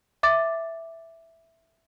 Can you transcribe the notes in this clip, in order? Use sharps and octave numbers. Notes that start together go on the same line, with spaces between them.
E5 D6 A6